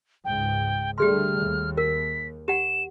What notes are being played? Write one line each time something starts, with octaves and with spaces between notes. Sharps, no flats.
C#2 G#2 G5
D3 G3 A3 G4 G#4 C6 F6
D#2
A#4 B6
G4 F#5 E7